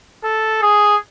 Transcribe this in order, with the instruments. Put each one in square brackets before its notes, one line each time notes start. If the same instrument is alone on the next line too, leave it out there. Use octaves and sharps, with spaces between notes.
[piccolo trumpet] A4
G#4